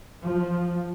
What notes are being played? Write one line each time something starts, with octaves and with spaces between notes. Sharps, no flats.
F3